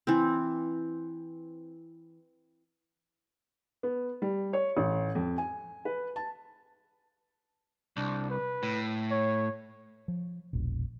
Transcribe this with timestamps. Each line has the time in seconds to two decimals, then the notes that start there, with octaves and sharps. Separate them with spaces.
0.07 E3 C4
3.83 B3
4.22 G3
4.53 C#5
4.77 A1
5.15 F2
5.38 G#5
5.85 B4
6.16 A5
7.97 C2 D4
8.30 B4
8.63 A2
9.11 C#5
10.08 F3
10.53 E1 A#1